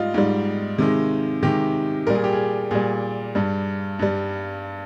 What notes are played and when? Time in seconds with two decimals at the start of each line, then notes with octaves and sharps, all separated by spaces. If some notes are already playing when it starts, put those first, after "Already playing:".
Already playing: G#2 G3 F4 D#5
0.14 G#2 G3
0.78 C3 D#3 G#3
1.43 C3 D#3 G#3 G4
2.07 A#2 G3 A#4
2.15 G#4
2.24 G4
2.32 G#4
2.71 A#2 G3 G#4
3.35 G2 G3
3.99 G2 G3